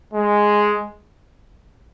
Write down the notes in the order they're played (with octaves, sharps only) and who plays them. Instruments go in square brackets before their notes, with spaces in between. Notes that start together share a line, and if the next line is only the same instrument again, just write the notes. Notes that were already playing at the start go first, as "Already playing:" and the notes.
[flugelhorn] G#3